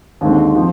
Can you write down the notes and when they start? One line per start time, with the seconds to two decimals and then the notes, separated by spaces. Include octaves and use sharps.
0.21 D#2 D3 G#3 C4
0.55 F3 C4